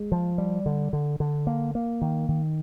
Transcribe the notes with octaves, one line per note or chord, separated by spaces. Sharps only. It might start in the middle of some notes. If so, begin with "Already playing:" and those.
Already playing: G#3
F3
G3
D3
D3
D3
A#3
A#3
D#3
D#3